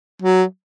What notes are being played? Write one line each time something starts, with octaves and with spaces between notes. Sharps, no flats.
F#3